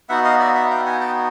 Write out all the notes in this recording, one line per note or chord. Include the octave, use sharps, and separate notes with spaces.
B3 D#4 F#4 E5 F#5
D#5 F5
D5 E5
E5 F#5
F5 G5
F#5 G#5
G5 A5